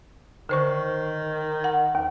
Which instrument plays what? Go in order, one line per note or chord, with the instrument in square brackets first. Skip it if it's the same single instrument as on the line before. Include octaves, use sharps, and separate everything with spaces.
[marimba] D3 C5 C#6 [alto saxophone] D#3
[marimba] F#5
D#2